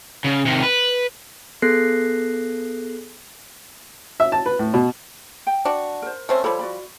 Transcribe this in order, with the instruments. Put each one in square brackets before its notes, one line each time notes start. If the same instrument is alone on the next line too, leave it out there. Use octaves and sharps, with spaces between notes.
[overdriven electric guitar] C#3
C3 D#3
B4
[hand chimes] B3 G#4 A4 F#6 A#6 C7
[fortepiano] E5
A5
B4
A2
B2
[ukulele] G5
[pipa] D4 F#4
[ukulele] A#4 C5
[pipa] A3 C4 C#4
[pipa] F3 G3 [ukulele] A4 C#5 B5
[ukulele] F#4 D5 B5